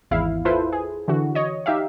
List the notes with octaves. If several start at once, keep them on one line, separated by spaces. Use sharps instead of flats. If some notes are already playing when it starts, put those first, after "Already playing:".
G#1 E2 E4 F5
E4 F4 A4 B4 C5
G#4
D3 E3 F#4
C#5 D#5
D#4 G4 E5 F5